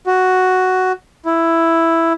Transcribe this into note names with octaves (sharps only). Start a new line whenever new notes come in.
F#4
E4